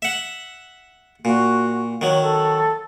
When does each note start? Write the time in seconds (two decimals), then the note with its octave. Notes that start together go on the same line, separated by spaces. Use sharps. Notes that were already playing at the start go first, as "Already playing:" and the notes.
0.02 E5 F#5
1.25 A#2 F#4
2.01 D#3 F#3 C#5
2.22 A4